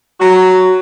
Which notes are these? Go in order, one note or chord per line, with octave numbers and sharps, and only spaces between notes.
F#3 F#4